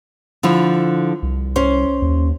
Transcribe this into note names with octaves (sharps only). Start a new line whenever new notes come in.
D3 F3 E4
C2
C#4 C5
D#2